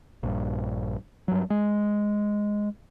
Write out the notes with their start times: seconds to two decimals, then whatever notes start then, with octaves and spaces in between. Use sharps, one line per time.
0.23 A#1 G2
1.28 G2 F#3
1.50 G#3